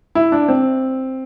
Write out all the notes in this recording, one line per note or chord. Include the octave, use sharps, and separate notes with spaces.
E4
D4
C4